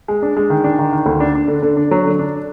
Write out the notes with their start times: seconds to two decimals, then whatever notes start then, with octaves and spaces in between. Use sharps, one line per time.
0.08 G#3
0.22 D4
0.37 G#3
0.50 D#3
0.64 D4
0.79 D#3
0.92 D#3
1.06 D2
1.20 D4
1.35 D4
1.48 D3
1.63 D3
1.77 D4
1.91 F#3
2.05 D3
2.19 D4